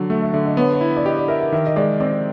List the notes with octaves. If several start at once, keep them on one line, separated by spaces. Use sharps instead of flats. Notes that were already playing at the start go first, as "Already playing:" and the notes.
Already playing: D3 F#3
A3 E5
E5
D3 E5
D#5
B3 C#5
C#5
E4
D5
G4 D#5
D5
A#4 E5
E5
D#3 E5
D#5
G#3 D5
C4 D5